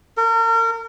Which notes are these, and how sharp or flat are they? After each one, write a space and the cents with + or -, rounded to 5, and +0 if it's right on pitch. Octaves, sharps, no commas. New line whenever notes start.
A#4 -35